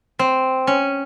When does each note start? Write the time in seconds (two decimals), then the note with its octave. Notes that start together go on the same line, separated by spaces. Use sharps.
0.19 C4
0.67 C#4